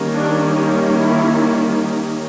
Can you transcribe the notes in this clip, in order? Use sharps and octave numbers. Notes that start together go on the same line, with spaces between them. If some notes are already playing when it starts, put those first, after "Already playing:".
Already playing: D#3 G3 A#3 C#4
D4
D#4
E4